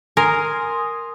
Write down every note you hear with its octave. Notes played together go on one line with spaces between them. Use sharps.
A#4 G#5 C6 D#6